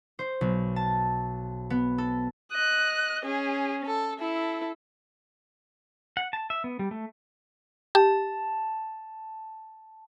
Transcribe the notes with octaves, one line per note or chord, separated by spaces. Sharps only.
C5
B1
A5
B3
A4
D#5 F#6
C#4 G#4
A4
E4 A4
F#5
A5
E5
B3
G3
A3
G4 A5